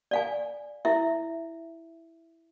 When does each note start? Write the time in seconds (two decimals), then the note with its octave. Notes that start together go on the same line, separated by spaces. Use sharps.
0.11 D5 F5 G#5
0.85 E4 E5